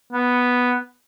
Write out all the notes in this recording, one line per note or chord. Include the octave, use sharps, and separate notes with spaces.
B3